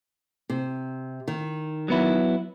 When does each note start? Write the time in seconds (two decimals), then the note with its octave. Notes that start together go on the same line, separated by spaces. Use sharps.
0.50 C3
1.28 D#3
1.88 F#3 B3 E4